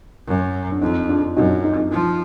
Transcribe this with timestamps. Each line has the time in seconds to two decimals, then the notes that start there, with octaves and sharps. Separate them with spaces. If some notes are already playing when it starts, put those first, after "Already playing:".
0.27 F#2
0.72 D4
0.81 F2 D#4
1.09 D4 F4
1.36 F#2 D#4 F#4
1.50 D#4
1.64 D#4
1.78 D#4
1.91 F3